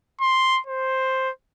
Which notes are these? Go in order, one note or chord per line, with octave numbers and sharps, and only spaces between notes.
C6
C5